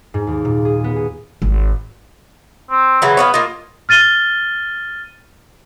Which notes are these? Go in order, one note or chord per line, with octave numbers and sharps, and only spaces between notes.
G#2
D#2
A#2
G#4
B3
G#4
G#1
C4
C#3 E3 F#3
B3 C#5 D5 F5
A#3 F4 D#5
F6 A6 D#7 G7